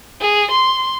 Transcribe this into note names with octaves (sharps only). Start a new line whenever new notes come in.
G#4
C6